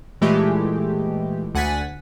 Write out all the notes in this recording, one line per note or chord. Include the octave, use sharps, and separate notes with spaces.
A#2 E3 G#3 A3 G4
D2 F#5 G#5 A6 B6